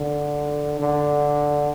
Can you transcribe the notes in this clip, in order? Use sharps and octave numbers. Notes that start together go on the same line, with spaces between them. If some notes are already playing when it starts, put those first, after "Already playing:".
Already playing: D3
D3